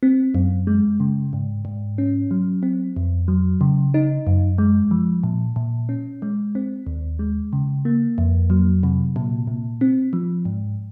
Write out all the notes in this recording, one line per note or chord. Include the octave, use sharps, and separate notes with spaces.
C4
F#2
G#3
C#3
G#2
G#2
C#4
F#3
C4
F2
F#3
C#3
D#4
F#2
G#3
F3
A#2
A#2
C#4
G#3
C4
D#2
G#3
C#3
A#3
F2
F#3
C3
A#2
A#2
C4
F3
G#2